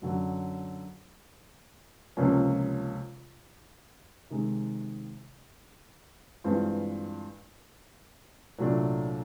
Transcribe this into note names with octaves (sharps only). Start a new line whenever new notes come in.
F#2 D3 F#3
C#2 C3 F3 A#3 C#4
C3 D#3 G#3 C4
G2 E3 G#3 C4 F4
C2 A#2 F#3 A3 D4